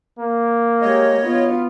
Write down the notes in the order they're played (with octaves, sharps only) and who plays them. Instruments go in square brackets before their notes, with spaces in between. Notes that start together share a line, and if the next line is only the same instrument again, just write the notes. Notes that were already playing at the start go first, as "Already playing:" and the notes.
[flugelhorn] A#3
[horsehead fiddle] G#3 G4 [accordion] C#5 D#5
[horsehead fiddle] B3 F4